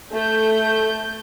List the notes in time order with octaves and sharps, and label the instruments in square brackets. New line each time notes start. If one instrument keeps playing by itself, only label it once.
[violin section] A3 G6